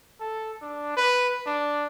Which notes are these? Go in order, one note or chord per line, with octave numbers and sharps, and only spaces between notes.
A4
D4
B4
D4